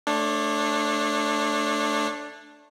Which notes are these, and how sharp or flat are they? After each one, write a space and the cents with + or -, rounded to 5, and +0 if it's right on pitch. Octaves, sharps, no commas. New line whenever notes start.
A3 +5 D4 +0 C#5 -35